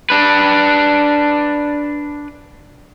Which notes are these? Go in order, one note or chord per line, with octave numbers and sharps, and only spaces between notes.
D4 B4